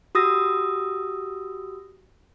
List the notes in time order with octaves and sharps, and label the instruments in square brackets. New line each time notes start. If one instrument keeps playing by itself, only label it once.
[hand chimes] F#4 G4 D#6 E6 A#6